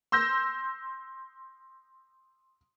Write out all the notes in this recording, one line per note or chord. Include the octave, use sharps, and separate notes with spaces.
C6 E6 G6 A#6